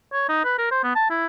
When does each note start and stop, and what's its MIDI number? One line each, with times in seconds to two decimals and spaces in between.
0.13 0.26 73
0.29 0.44 63
0.44 0.56 71
0.58 0.68 70
0.71 0.79 72
0.84 0.91 59
0.96 1.05 81
1.10 1.27 64